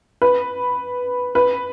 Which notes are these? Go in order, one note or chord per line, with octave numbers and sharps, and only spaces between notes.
B4
B4